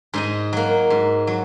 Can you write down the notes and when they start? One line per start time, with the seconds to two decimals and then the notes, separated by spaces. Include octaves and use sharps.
0.14 G#2 D#4 D#5
0.53 F#3 A#3
0.90 G#2
1.27 F#3